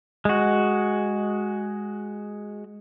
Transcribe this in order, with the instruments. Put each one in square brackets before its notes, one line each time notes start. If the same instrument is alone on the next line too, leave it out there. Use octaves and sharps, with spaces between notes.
[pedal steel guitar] G#3 F#4